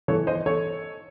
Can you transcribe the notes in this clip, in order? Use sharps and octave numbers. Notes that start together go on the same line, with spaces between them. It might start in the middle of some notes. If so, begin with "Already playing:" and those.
E3 A4 C#5
C5 D#5
A4 C#5